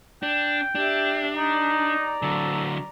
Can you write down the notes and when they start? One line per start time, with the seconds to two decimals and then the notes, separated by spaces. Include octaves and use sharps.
0.23 D4 G5
0.75 D4 G4 E5
1.36 D#4 D5 A#5
2.22 D3 F#3 A4